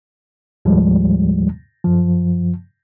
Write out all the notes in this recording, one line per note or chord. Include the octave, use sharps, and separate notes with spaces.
D#2 A2 F3 G3 G#3
F#2 F3